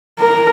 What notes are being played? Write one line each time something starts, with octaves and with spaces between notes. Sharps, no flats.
A#4